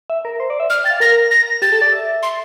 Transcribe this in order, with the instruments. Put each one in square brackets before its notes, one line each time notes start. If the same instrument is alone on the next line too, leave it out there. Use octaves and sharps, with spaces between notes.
[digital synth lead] E5
A#4
C5
D5
E5
[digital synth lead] D5 [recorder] F6
[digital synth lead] G5 [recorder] A6
[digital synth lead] F5
[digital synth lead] A#4 [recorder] A#6
[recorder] A#6
[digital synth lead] G4 [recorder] A6
[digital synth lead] A4
D5
E5
[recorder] C6